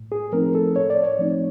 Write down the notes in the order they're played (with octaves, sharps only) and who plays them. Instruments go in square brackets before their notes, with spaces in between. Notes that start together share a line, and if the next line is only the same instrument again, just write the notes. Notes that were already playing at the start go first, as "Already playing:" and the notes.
Already playing: [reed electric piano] A2
G#4
F3 A3 C4 D#4 A#4
A4
A2 C#5
D5
C#5
F3 A3 C4 D#4